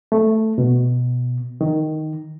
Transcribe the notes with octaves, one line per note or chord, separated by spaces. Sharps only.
A3
B2
D#3